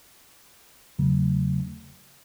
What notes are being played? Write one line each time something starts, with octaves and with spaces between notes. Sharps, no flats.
E2 C#3 F#3 A3